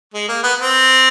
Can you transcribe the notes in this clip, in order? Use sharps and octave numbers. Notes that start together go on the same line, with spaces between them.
G#3
A#3
B3
C4